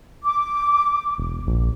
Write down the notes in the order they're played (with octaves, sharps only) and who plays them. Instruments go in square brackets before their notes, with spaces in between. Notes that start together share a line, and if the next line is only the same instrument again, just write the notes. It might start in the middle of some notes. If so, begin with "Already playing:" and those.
[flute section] D6
[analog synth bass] E1
A#1